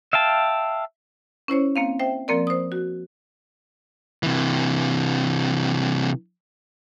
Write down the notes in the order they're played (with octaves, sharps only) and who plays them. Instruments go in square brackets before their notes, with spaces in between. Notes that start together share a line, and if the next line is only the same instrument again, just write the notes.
[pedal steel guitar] E5 F5 G5 A5
[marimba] C#4 E4 C5 C#5
A#3 C4 F5
C5 E5 G5
F3 A#3 C4 A#4 D5
C5 D#6
F#4
[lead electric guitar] C3 E3